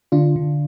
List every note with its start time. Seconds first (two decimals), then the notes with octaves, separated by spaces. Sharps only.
0.12 D3 D4 F4
0.36 D3